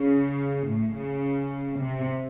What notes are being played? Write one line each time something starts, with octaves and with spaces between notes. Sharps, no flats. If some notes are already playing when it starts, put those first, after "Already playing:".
Already playing: C#3
A2
C#3
C3